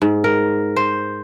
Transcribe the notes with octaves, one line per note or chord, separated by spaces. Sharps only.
G#2
A#4
C5